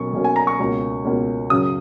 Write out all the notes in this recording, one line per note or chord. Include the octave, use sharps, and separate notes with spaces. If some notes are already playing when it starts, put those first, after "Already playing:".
Already playing: B1 B2 A#3 C#4 C#6
B1 B2 A#3 C#4
G#5
A#5
C#6
C#2 B2 A#3 C#4
C#2 B2 A#3 C#4
F#2 C#3 F#3 D#6